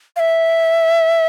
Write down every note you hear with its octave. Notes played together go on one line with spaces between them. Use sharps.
F5
E5